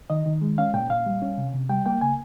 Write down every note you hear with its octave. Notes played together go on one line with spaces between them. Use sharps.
D#3 D#5
D#3
G#3
C#4 F5
A#2 G5
A#2 F5
G3
C#4
C3
C3
G3 G5
A#3 G5
C#3 G#5